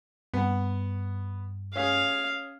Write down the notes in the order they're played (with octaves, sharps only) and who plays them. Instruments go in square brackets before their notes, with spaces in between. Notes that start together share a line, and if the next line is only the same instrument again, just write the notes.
[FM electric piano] G2 [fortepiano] B3 F#5
[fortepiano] C#4 G#4 [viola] F5